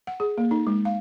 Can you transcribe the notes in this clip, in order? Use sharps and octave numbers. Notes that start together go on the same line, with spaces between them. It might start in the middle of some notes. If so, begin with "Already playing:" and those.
F#5
G#4
A#3
D#4
G#3
F5